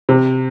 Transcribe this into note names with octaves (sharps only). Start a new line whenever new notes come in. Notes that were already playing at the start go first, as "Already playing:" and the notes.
C3